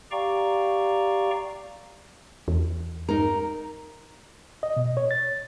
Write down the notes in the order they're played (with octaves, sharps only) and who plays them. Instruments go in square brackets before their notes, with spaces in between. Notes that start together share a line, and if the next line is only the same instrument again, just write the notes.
[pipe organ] G4 D5 F5 G5 A#5 C#6
[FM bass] E2
[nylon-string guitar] D#4 A#4
[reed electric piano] D#5
B2
C#5
A6